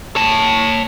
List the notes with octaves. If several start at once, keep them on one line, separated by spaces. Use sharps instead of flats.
C#5 A5